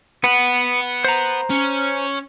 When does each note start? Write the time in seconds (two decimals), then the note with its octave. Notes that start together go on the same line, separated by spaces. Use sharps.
0.24 B3 B4 F#5
1.05 C5 A#5
1.50 C#4